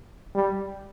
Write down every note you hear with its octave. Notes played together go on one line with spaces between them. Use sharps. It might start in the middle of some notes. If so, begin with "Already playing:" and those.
G3